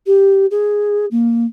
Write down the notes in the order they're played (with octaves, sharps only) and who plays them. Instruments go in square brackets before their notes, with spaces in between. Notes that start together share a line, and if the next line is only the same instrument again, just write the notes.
[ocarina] G4
G#4
A#3